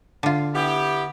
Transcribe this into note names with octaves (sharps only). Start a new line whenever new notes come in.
D3 F4
B3 E4 G4